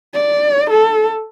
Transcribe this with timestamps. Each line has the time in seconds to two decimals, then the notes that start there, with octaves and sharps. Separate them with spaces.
0.14 D5
0.71 A4